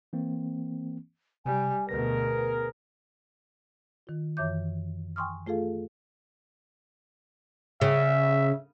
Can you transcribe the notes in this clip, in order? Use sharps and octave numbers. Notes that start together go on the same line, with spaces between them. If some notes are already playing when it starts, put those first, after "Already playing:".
E3 A#3 C4
C3 G3 G#5
D2 B2 B3 G#4 A#4 B4 A#6
D#3 F4
F#2 E3 C#5 E5 D6 G6
G5 G#5 C6 C#6 D#6 F6
A3 F4 G#4 A4 F5
C#3 E5